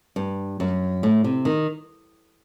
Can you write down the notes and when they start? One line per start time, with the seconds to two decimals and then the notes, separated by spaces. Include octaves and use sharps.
0.16 G2
0.60 F#2
1.03 A2
1.24 C3
1.45 D#3